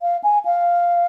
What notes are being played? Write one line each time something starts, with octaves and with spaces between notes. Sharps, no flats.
F5
G#5
F5